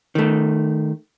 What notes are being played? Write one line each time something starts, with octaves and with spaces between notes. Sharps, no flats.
D#3 A3